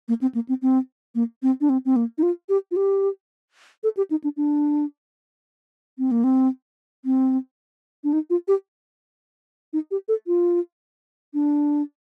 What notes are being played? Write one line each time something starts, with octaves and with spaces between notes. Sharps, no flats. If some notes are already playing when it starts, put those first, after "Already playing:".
A#3
C4
A#3
C4
C4
A#3
C4
D4
C4
C4
A#3
D#4
F4
G4
F4
G4
A4
G4
D#4
D4
D4
C4
A#3
C4
C4
D4
D#4
F4
G4
D#4
G4
A4
F4
D4